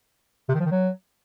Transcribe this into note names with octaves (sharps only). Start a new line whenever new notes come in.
C3
D#3
F3
D#3
F#3